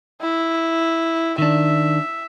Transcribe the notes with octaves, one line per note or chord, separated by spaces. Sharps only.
E4
D#3 D4 E5